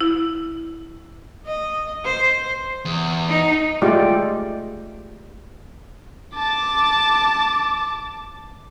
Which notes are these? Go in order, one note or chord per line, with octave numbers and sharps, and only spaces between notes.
E4
D#5
C5
E2
D#4
G#3 A3 F4 G4 D5 D#5
A5 D6